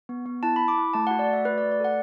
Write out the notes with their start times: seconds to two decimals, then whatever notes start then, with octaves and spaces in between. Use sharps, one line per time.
0.09 B3
0.26 B3
0.43 E4 A5
0.56 B5
0.60 E4
0.68 D6
0.78 E4
0.94 A3 A5
1.07 F#5
1.11 F#4
1.19 D5
1.29 A3 E5
1.45 F#4 B4
1.58 D5
1.63 A3
1.71 D5
1.80 A4 F#5